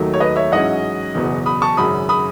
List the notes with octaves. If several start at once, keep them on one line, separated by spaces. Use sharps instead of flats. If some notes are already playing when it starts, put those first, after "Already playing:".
Already playing: D#2 D#3 F#3 A3 D#4
C#5
B4 D#5
C#5 E5
A1 G#2 F#3 C#4 E4 D#5 F#5
F#1 E2 B2
B5 D#6
A5 C#6
G#1 F#2 C#3 B5 D#6
B5 D#6